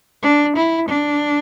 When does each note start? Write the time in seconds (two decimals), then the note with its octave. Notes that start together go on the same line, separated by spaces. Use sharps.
0.23 D4
0.56 E4
0.89 D4